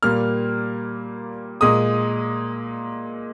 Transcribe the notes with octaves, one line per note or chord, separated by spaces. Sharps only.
A#2 G3 A#3 F6
A#2 G#3 D#6